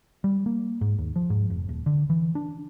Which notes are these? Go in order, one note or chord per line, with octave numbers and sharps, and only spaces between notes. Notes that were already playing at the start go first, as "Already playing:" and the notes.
G3
A#3
G#2
D#2
F3
G#2
F1
D#1
D3
E3
D4